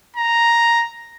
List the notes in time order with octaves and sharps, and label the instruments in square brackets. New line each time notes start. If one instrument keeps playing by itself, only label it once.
[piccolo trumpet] A#5